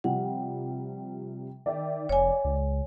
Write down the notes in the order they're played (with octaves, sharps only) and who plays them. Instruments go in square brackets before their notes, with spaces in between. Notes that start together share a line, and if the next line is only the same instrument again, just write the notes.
[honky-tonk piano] C3 F3 G3 [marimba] F#5
[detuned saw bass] D#3 [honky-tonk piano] D5 E5 G5
[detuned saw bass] F1 [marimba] C#5 G#5
[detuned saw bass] C#2